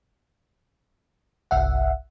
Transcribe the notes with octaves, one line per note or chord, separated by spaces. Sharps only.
G1 C2 E5 F#5